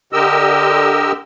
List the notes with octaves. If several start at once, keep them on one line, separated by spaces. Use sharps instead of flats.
D3 G4 A#4 D#5 E6